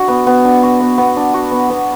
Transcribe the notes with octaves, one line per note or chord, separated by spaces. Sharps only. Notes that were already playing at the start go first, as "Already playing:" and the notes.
Already playing: D4 F#4
B3
B3
D4
F#4
B3
B3
D4
F#4
B3
B3